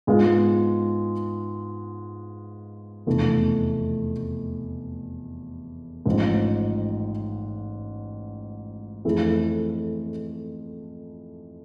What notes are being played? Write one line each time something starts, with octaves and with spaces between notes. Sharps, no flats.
G#2 G#3 B3 F4
F1 E2 B2 A3 E4
A1 G#2 F3
F2 E3 A3 E4 G#4